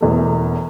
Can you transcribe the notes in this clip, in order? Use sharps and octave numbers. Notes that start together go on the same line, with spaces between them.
E1 E2 E3 A3